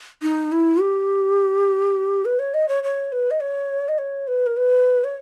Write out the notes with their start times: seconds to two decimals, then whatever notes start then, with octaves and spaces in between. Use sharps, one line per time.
0.22 D#4
0.52 E4
0.80 G4
2.25 B4
2.39 C#5
2.54 D#5
2.68 C#5
2.84 C#5
3.12 B4
3.31 D#5
3.40 C#5
3.88 D#5
3.98 C#5
4.27 B4
4.46 A#4
4.57 B4
5.04 C#5